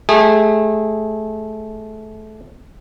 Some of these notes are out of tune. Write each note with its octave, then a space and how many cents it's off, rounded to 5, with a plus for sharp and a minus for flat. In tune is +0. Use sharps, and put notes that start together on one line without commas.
A3 -25 G#4 -25